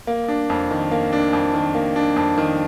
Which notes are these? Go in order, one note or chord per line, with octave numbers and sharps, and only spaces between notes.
A#3
D4
F2
D#3
A#3
D4
F2
D#3
A#3
D4
F2
D#3